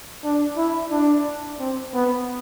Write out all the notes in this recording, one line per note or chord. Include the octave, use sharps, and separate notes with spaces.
D4
E4
D4
C4
B3